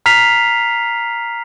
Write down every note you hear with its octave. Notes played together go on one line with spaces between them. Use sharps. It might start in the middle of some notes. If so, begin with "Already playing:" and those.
A#5 F6 B6 C7 F7